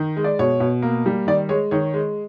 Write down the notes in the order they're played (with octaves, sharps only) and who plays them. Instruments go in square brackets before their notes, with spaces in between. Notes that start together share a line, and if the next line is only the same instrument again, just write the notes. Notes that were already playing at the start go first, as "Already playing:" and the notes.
Already playing: [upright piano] D#3
G#3
D5
B2 C#5
B2
A#3
G3
D#3 D5
G#3 C#5
D#3 C#5
G#3